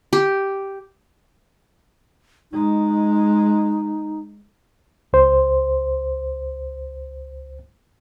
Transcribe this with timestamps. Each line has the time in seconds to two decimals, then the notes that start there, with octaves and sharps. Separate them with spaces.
0.13 G4
2.52 G#3 D#4
5.13 C#2 C5